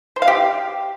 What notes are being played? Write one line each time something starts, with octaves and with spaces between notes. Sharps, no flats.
C5
F5
G4